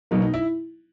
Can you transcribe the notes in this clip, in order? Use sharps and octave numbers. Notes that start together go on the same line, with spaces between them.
B2 F#3 A#3 D#4
D#4
E4